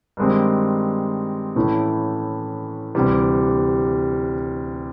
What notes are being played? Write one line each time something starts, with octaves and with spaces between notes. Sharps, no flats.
G2 D#3 G#3 C4
A2 E3 A3 C#4 E4
D2 C3 E3 G3